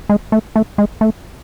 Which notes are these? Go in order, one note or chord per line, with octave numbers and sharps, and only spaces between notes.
G#3
A3
A3
G#3
A3